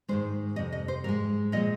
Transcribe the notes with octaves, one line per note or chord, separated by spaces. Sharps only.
G#2 D#3 G#3 C5
F2 C3 D#5
D#5
C5
G#2 G#3 A#4
A#2 F3 G#3 D#5